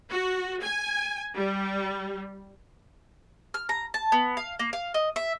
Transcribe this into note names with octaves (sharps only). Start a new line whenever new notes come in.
F#4
G#5
G3
F6
A#5
A5
B3
F5
A#3
F5
D#5
E5